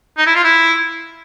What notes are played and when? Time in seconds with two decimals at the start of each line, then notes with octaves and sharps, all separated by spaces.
0.17 D#4
0.26 E4
0.35 F4
0.44 E4